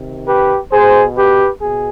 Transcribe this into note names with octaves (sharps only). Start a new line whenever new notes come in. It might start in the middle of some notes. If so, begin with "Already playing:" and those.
Already playing: C3 D#3
G4 B4
B2 G#4 C5
G4 B4
B2 G#4